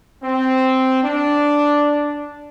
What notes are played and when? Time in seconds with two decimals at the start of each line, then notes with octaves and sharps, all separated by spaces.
0.23 C4
1.03 D4